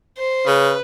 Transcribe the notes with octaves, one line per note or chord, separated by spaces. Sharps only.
C5
C#3 B4